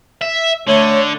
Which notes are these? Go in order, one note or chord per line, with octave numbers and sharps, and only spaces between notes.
E5
D3 A3 C#5